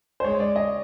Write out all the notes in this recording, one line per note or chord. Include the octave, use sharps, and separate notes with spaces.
C5
G#3 C#5
D5
D#5